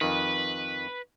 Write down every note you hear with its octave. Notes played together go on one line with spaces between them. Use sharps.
F2 D#3 B4